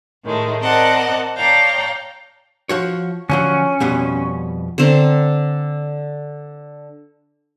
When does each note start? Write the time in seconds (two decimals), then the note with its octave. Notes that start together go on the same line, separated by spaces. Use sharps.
0.23 A2 D#3 G#3 A3
0.62 C4 A#4 D5 D#5 F#5 A5
1.36 C#5 D5 F5 G5 A5 A#5
2.69 F3 F#4 C#5
3.30 D3 F3 F#3 C#4
3.80 F2 B2 G3
4.78 D3 C4 A#5